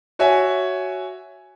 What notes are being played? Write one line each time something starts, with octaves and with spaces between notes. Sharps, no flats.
F#4 C#5 E5 G#5